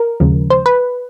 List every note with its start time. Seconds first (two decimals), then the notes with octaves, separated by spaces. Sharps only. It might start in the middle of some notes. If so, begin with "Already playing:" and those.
Already playing: A#4
0.20 D#2 C#3 F3 G#3
0.50 C5
0.66 B4